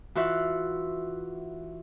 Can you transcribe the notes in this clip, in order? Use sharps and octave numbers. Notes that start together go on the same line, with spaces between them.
E3 F4 F#4 E5 F#6